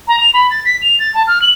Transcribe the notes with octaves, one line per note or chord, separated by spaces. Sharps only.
A#5
F7
B5
A6
B6
F7
A6
A5
F6
F#7